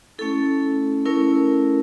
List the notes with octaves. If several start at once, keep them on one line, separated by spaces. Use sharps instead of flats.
A3 C#4 E4 A4
A3 C#4 E4 A#4